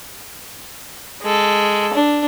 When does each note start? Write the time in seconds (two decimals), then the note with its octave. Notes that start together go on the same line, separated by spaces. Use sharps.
1.22 G#3 A4
1.94 D4